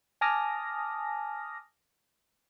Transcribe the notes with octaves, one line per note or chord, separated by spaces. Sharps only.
G#5 A5 D6 D#6 F6 A#6